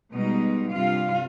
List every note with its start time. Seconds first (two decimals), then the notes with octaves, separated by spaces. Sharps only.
0.12 B2 G3 G#3 D#4
0.70 G2 C3 G3 F4 F5